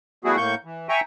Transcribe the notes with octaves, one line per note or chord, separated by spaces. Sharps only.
G3 A3 B3 E4 F#4 G#4
A2 A#3 C#6 G6
E3
E5 G5 G#5 A#5 C#6